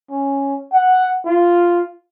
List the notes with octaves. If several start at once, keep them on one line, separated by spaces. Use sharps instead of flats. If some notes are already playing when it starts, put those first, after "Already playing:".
C#4
F#5
F4